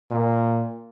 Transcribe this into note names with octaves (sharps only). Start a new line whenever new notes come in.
A#2